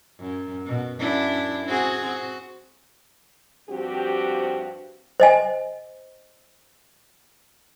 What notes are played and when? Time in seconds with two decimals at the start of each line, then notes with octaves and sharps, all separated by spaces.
0.20 F#2
0.66 B2
0.99 F#2 D4 E4
1.66 C4 F#4 G#4
2.02 C4 F#4
3.69 G2 F3 C4 F#4 G4
5.20 C5 D#5 G#5